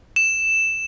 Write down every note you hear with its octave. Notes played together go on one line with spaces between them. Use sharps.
E7